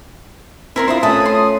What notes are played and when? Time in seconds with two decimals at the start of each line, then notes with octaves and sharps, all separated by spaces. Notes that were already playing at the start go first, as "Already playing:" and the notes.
0.76 C4 E4 A#4 C6
0.88 D4 E4 F4 C5 B5 D#6
1.03 A3 C#4 A4 B4 A5 D#6
1.26 C6